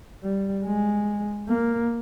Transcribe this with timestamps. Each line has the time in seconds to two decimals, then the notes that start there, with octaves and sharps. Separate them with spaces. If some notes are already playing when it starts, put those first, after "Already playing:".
0.23 G3
0.65 G#3
1.49 A#3